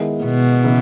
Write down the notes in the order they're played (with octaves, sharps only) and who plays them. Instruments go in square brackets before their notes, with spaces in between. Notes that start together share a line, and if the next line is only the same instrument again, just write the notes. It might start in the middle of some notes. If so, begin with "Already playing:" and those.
Already playing: [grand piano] D#3 G#3 B3 E4
[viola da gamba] B2
[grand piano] C#3 E3